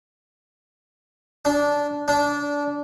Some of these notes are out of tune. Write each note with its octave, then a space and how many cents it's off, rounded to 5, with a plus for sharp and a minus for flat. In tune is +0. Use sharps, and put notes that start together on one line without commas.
D4 -15
D4 -20